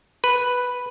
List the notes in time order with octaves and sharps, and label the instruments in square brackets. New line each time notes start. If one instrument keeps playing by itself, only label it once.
[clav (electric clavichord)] B4